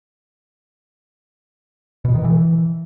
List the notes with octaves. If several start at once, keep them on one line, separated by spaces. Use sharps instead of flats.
B2
D#3
E3